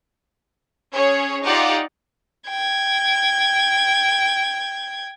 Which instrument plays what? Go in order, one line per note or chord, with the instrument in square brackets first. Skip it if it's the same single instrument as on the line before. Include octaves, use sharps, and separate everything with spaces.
[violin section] C#4 G#4 C#5
D#4 F4 G4 D5 F#5
[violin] G5 G#6